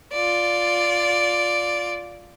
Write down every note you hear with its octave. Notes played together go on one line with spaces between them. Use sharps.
F4 D5